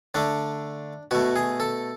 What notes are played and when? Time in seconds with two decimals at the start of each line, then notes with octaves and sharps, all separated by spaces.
0.14 D3 A3 D4
1.11 B2 A3 F#4
1.36 G#4
1.60 A4